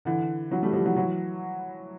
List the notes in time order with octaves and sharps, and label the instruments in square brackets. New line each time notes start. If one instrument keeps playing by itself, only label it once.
[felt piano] D3 E3
E3 F#3
G3 A3
F3 G3
E3 F#3
E3 F#3